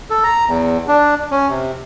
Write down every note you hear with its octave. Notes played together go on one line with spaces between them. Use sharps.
A4
A#5
E2
D4
C#4
C3